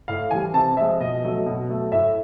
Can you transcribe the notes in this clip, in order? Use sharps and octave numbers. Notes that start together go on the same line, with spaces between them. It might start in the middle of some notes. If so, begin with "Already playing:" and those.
A2 F5
E3 G3 G#5
C3 A5
F3 G#3 E5
B2 D#5
F#3 A3
B2
F#3 A3
A2 E5